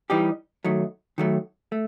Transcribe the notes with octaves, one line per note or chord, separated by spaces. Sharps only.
E3 G3 D#4 G4
D#3 F#3 A3
D#3 F#3 A3
A3